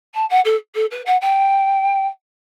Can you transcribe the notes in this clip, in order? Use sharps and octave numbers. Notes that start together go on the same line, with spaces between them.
A5
F#5
A4
A4
B4
F#5
G5